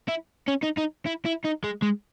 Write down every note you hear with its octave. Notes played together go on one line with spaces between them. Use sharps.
E4
C#4
D#4
D#4
E4
E4
D#4
G#3
G#3